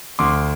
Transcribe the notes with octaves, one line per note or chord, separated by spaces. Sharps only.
D2 C6 D6